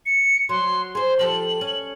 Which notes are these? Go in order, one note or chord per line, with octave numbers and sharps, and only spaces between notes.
C#7
F#3 C6
G#4 C5 C6
F3 G4 A4 F#7
C#4